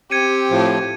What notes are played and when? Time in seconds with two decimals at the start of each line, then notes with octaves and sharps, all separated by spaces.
0.11 C4 G4 G#6 C#7 D#7
0.50 A2 F3